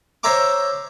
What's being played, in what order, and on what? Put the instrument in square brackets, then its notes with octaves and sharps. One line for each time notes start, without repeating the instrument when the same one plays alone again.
[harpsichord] C5 C#5 E5 A#5 D6